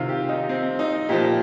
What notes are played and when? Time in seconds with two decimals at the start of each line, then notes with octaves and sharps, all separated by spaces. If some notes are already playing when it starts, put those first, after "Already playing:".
Already playing: C3 D#3 F4
0.09 G4
0.29 D#4
0.49 C4
0.79 D#4
1.09 A#2 F3 G4